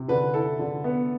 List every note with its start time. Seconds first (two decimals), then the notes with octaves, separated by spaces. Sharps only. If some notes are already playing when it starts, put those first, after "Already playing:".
Already playing: C3
0.08 D3 B4
0.34 E4 A4
0.59 D3
0.84 B3